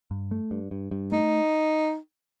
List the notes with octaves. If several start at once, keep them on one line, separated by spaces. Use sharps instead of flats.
G2
A3
G2
G2
G2
A3 D#4